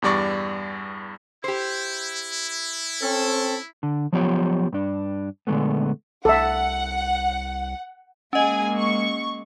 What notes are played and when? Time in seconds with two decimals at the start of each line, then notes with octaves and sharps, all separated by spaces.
0.02 E2 G2 G3 D5 C#6
1.44 E4 G4 C5
3.02 C4 C#4 A4
3.83 D3
4.13 F3 F#3 B3 F4 G4 C#5
4.73 G2 D4
5.47 A#2 D3 G#3 A3 B3
6.25 C2 A4 E5 F#5
8.33 G#3 A#3 C#4 G#4 D#5 G#5
8.75 C#6